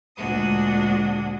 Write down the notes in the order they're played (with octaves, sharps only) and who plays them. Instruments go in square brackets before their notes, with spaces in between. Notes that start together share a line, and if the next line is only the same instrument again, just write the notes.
[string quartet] D2 A#2 G#3 D4 F#4 D#6